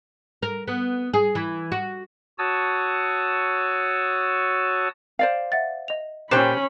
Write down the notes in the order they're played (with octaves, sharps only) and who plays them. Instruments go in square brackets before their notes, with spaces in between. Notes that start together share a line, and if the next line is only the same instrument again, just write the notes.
[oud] A#4
B3
G#4
E3
F#4
[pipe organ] F#4 C#5 A5 D#6 E6
[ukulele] C5 D5 F5
[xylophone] E5 F#5 A6
D#5 F7
[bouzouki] A#2 G5 [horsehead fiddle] C#4 B5 [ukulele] G4 C5 [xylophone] F#6 E7